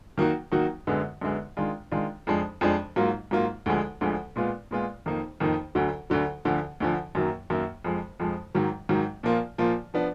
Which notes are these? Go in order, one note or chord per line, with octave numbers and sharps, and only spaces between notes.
D#3 F#3 A#3 D#4 F#4
D#3 F#3 A#3 D#4 F#4
F#2 D3 G#3 B3
F#2 D3 G#3 B3
D#3 G#3 D4 F4
D#3 G#3 D4 F4
F2 F3 G#3 D4
F2 F3 G#3 D4
G#2 F#3 A#3 F4
G#2 F#3 A#3 F4
D2 D3 F3 G#3
D2 D3 F3 G#3
A#2 G#3 B3 F4
A#2 G#3 B3 F4
F2 D#3 A#3 D#4
F2 D#3 A#3 D#4
D2 D3 F#3
D2 D3 F#3
D2 D3 F3
D2 D3 F3
F#2 D#3 F#3 A#3
F#2 D#3 F#3 A#3
F2 F3 G#3
F2 F3 G#3
G#2 D#3 F#3
G#2 D#3 F#3
A#2 F3 A#3 F4
A#2 F3 A#3 F4
F3 B3 D4